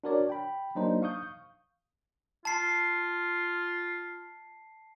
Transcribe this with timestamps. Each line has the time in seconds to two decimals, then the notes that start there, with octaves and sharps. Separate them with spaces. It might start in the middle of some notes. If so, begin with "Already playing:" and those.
0.04 D4 F#4 A#4 C#5 D5
0.29 G5 B5
0.75 F#3 A#3 D4 D#4 C5
1.02 F5 C#6 D#6 G6
2.45 F4 A5 C7